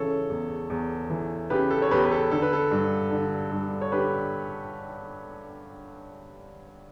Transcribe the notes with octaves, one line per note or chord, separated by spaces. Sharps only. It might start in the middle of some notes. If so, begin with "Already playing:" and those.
Already playing: C#3 E3 A4 C#5
E2
E2
E3
C#3 G4 B4
A4
C#5
E2 G4 B4
B4
A4
D3 A4
B4
A4
G2
D3
G2
C#5
D3 G4 B4